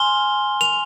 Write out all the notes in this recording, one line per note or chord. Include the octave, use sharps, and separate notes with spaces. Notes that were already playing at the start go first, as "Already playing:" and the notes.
Already playing: G#5 C6 F6 G7
F7